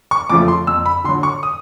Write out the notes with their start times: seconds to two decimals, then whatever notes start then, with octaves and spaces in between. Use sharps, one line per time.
0.11 C#6
0.29 F2 C#3 F3 A3 D6
0.48 C6
0.67 F2 E6
0.86 B5
1.04 D3 C6
1.09 F#3
1.23 C#6
1.43 D#6